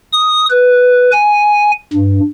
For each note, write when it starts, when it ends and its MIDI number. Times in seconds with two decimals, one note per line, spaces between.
0.13 0.46 87
0.50 1.10 71
1.12 1.71 80
1.93 2.19 43